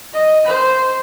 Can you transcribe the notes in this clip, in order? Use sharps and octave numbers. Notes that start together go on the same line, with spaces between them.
D#5
C5